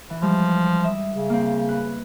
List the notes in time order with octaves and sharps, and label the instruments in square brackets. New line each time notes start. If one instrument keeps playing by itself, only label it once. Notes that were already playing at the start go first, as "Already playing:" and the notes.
[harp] E3
[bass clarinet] F3 [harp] G3 G#3
[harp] D#5 E5
[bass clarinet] C#3
[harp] A#3 C4
B4